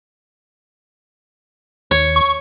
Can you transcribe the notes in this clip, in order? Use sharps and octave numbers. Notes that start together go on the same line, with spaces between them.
D#2 C#5
C#6